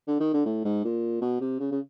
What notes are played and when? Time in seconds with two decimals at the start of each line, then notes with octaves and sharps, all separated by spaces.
0.08 D3
0.20 D#3
0.34 D3
0.45 A2
0.65 G#2
0.85 A#2
1.21 B2
1.41 C3
1.60 C#3
1.72 C#3